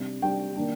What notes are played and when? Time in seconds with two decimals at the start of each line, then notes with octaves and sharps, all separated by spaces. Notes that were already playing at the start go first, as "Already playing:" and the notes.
Already playing: C3 G3 D4
0.22 C3 G3 D4 G5
0.56 D#3 A#3 D4